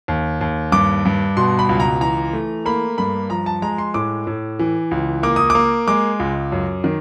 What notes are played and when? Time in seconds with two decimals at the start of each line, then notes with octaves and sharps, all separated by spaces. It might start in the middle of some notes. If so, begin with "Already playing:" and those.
0.08 D#2
0.41 D#2
0.72 G2 D6
1.05 G2
1.37 B2 C6
1.59 B5
1.69 C#2
1.80 A#5
2.01 E3 A#5
2.33 A3
2.65 A#3 B5
2.98 G2 B5
3.30 F3 A#5
3.46 A5
3.62 G#3 A#5
3.78 C6
3.94 A2 D6
4.27 A2
4.59 E3
4.91 C#2
5.23 A#3 D6
5.36 D#6
5.50 D6
5.55 A#3
5.88 G#3 D6
6.20 C#2
6.52 F#2
6.84 D#3